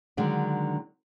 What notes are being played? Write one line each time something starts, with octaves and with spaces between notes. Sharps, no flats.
D3 D#3 F#3 G#3 D4